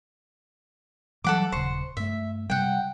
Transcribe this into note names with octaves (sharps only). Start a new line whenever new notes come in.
E3 F#3 G3 A4 F#5 D6
D#1 C#3 C5 C#6
G2 A3 E5
C3 G3 F#5 G5